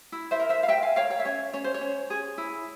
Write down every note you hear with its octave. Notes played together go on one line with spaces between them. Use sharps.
E4
C5 E5
A#4
C5 E5
F5
A#4 E5 G5
F5 G#5
A#4 C#5 F5
C#5 F5
E5
C#4 C#5
C#4 C#5
C5
C#5
C#4
G#4
E4